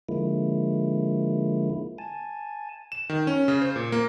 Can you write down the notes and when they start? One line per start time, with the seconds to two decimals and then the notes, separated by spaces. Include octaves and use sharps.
0.09 D3 F3 G#3 A#3 E4
1.98 G#5 A5
2.92 E7
3.09 D#3
3.27 C#4
3.48 C#3
3.62 C5
3.76 A#2
3.92 A#3